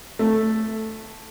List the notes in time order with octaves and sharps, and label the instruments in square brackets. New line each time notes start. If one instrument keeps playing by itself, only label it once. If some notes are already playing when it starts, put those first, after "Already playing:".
[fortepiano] A3